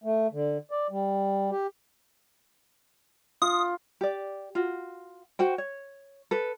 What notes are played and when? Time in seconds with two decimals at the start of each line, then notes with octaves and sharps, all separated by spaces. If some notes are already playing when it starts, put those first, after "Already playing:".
0.04 A3
0.33 D3
0.71 D5
0.90 G3
1.51 G4
3.42 F4 D#6
4.01 G4 D5
4.55 F4 F#4
5.39 F#4 C5 G5
5.58 C#5
6.31 A4 B4